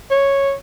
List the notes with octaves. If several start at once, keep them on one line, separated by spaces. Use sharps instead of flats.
C#5